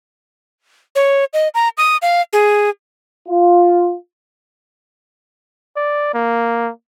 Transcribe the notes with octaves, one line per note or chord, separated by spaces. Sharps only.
C#5
D#5
A#5
D#6
F5
G#4
F4
D5
A#3